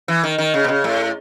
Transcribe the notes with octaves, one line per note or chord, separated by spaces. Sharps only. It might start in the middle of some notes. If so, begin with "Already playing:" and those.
E3
D#3
D#3
C#3
B2
C#3
A2